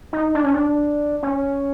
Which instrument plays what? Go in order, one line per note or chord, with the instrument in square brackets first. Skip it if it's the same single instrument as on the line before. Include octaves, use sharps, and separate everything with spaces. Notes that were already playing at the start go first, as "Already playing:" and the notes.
[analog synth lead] D#4
D4
C#4
D4
C#4